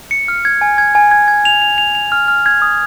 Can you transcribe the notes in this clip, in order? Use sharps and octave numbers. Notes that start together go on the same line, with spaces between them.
C#7
F6
G#6
G#5
G#6
G#5
G#6
G#6
F7
F7
F7
F7
F6
F6
G#6
D#6